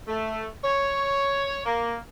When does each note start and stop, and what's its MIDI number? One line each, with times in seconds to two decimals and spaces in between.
0.08 0.46 57
0.64 1.60 73
1.66 1.96 58